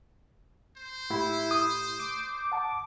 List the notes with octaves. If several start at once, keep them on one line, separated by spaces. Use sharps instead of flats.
C5
A2 A3 E4 G4
D#6
D6
F#5 A5